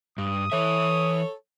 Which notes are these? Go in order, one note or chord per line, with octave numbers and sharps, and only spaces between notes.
G2 D#6
E3 A4 C#5 E5